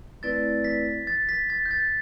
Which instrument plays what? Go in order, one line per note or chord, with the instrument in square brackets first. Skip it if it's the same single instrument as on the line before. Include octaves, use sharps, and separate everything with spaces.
[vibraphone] A3 C4 E4 B4 D5 [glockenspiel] A6
[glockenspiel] B6
A6
B6
A6
G6
A6